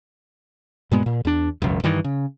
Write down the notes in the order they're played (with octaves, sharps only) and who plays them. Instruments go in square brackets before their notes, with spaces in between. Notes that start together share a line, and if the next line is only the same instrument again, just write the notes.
[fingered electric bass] G2 A#2 G#3 B3
A#2
E2 D4
E1 C#2 F#2
G2 D#3 E3
C#3